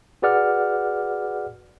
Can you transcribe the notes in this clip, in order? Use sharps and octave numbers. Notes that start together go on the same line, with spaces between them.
F#4 G#4 B4 D5 F#5 F6